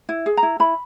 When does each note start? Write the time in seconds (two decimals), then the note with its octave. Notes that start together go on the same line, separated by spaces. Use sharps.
0.09 E4
0.26 G#4
0.37 A#5
0.43 E4
0.60 E4 B5